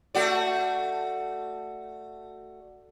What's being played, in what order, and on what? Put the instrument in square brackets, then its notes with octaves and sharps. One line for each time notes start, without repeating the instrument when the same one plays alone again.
[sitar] A3 F#4 D5